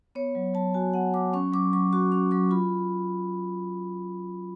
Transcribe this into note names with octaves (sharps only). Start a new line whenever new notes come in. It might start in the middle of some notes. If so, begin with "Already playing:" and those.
B3 C#5
F#3
F#3 A5
F#4 G#5
B3 F#5
F#3 D6
C#4 C#6
F#3 D6
F#3 C#6
F#4 C#6
C#4 C#6
F#3 C#6
F4 B5